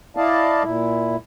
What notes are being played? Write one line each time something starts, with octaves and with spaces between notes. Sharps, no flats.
E4 D5 D#5 F5 A5
A#2 E4